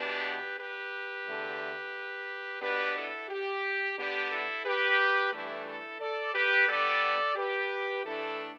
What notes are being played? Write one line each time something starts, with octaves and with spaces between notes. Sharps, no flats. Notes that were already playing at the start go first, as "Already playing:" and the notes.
Already playing: E2 B2 B3 D4 G4 B4
G4 B4
E2 D3 A3
B2 B3 D4 G4 B4
E4 A4
G4
D3 B3 D4 G4
E4 A4
G4 B4
G2 E3 A3 D4 E4 A4
E4 A4
A4 D5
G4 B4
D3 G3 B3 A4 D5
G4 B4
A2 E3 A3 D4 E4 A4